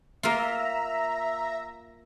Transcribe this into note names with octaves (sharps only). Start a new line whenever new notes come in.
A#3 F4 E5 A#5